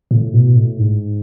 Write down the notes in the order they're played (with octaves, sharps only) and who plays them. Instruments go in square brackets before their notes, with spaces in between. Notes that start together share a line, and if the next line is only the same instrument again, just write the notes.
[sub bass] A2
B2
A2
G#2